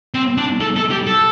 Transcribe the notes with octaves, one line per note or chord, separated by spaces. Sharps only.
C4
D4
A4
A4
G4
A4